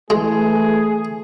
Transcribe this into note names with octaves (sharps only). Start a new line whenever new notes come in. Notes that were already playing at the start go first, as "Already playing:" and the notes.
E3 G#3 A3 G#4